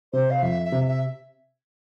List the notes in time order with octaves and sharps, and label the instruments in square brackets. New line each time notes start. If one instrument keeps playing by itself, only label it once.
[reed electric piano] C3 [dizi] C5
[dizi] F5
[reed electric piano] F2 [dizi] E5
[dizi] E5
[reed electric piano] C3
[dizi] E5